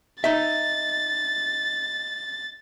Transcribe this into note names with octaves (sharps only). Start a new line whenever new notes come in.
D#4 E5 A6